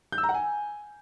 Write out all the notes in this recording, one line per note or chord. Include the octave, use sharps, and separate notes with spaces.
G6
E6
A#5
F#5
G#5